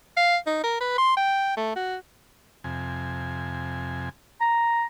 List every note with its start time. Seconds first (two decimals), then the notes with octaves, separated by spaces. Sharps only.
0.17 F5
0.47 D#4
0.64 A#4
0.81 B4
0.98 C6
1.17 G5
1.57 A3
1.76 F#4
2.64 F2 C3 G#5
4.41 A#5